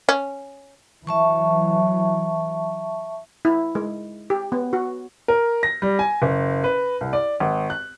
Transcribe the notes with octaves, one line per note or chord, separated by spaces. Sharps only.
C#4
E3 F#3 E5 A5 C#6
E4
G#3
G4
B3
F#4
A#4
A#6
G3
G#5
F#1
B4
C2
D5
G#1
F#6